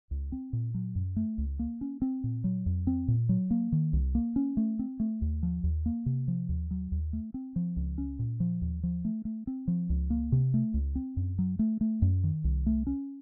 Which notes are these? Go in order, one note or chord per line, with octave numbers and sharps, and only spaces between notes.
C#2
C4
A#2
F#3
F#2
A3
C#2
A#3
C#4
C4
A#2
F#3
F2
C4
A#2
F#3
A#3
D#3
C2
A#3
C#4
A3
C4
A3
D#2
F3
D#2
A#3
C3
F3
D#2
F#3
D#2
A3
C4
F3
C#2
C#4
A#2
F3
D#2
F3
A3
A3
C4
F3
C#2
A#3
C3
A3
C#2
C4
F#2
F#3
A3
A3
F#2
D#3
C2
A3
C#4